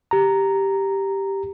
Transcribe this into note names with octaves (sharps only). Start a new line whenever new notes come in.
G4 A#5